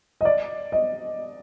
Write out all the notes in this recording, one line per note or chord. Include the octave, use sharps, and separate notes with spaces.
D#5
D5
D#5